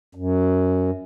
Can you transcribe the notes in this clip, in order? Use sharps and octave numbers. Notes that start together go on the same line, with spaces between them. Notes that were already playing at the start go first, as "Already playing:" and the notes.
F#2